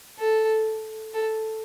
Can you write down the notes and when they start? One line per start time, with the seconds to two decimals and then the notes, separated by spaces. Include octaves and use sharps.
0.19 A4
1.14 A4